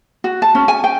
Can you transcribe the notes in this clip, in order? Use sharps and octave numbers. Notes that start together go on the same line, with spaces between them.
F#4
A5
C#4
G#5
G5